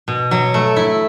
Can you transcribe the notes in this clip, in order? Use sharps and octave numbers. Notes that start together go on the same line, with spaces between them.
B2
F#3
A3
E4